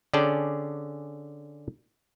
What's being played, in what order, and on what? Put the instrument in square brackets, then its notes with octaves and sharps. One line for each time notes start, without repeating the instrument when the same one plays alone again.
[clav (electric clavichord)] D3 C#4 G#4 D5 G5 A5